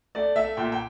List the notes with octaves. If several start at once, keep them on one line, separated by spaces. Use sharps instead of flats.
A3 D5
A3 E5
A#2 G5
G5